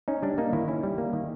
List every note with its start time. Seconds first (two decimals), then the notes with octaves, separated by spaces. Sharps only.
0.08 C#4 D#4
0.22 G3 D4
0.38 A#3 D#4
0.53 D#3 E4
0.68 C#4 E4
0.83 G3
0.98 A#3
1.13 D#3